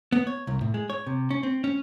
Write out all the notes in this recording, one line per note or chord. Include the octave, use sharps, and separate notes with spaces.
B3
C#5
C2
A2
G#3
C#5
C3
C#4
C4
C#4